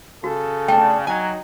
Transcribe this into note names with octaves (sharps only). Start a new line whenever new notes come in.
C#3 F#4 A4
A3 D4 G5
F#3 D#4 G#5